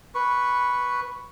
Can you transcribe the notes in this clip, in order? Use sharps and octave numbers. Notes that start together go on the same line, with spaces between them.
B4 C#6